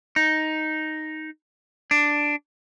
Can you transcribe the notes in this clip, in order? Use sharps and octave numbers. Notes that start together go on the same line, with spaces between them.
D#4
D4